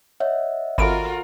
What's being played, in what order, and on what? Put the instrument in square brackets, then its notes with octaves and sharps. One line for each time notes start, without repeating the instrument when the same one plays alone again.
[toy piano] C#5 [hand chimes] D#5 E5 F#5
[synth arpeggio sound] G#1 D7 [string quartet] F4 F#4 A#4 [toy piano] A4 B5